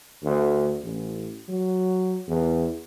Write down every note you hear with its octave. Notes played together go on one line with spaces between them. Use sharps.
D2
A1
F#3
E2